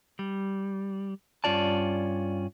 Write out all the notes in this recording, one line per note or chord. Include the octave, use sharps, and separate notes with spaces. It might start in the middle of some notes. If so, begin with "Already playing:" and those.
G3
G2 C#4 F4 D5 A5